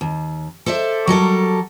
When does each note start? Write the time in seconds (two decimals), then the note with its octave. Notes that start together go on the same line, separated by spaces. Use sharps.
0.01 D#2
0.66 A4 C5 D5 E5
1.07 F#3 G3 A4 A#4